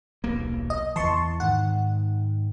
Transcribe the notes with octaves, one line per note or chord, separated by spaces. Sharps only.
D#1 B1 A#3
D#5
E2 E3 A5 C6 C#6
G#2 D#3 F#5